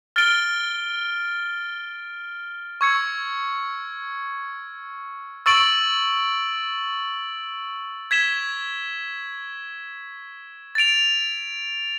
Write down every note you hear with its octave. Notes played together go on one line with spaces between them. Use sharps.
F6 A6 D7 G7
C#6 E6 G#6 C#7
C#6 E6 A6 D7 F#7
G#6 B6 E7 G7
A6 D7 F7